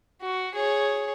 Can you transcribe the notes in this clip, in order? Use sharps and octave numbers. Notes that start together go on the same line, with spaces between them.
F#4
G#4 C#5